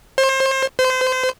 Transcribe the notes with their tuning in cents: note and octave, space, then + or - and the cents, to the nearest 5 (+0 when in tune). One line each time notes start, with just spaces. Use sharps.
C5 +30
C5 -30